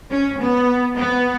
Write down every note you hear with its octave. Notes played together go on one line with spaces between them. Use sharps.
C#4
B3
B3